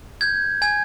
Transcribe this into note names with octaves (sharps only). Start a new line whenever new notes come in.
G6 G#6
G#5 G#6